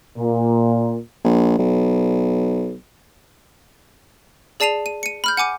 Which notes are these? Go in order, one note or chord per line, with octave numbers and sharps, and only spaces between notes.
A#2
A#1
B1
G#4 D5 A5 C7 D#7 F7
D#7
C#7 D#7
B5 F6 G6
F#5 G#5 D6 D#7